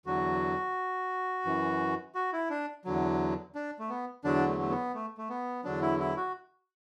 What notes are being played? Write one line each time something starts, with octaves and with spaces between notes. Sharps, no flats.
E2 D3 F#3 F#4
F#2 E3
F#4
E4
D4
E2 D3 F#3
D4
A3
B3
E2 D3 F#3 D4
A3
A3
B3
A3
A3
B3
E2 D3 F#3 D4
E4
E4
F#4